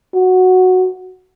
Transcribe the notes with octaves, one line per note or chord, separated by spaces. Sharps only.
F#4